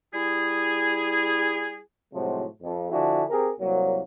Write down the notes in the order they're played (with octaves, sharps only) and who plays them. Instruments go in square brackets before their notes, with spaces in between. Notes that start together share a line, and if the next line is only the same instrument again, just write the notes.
[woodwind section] G3 E4 G#4
[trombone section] A2 C3 F3 F#3 G#3 F#4
F2
D3 F3 D4 E4 F#4 G#4
C4 G4 G#4 A#4
C2 F#3 A#3